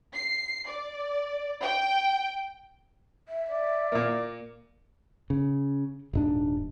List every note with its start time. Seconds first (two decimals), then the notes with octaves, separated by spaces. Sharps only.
0.14 C7
0.67 D5
1.62 G5
3.28 E5
3.51 D5
3.92 A#2 A#3
5.30 C#3
6.13 D#1 G#2 D4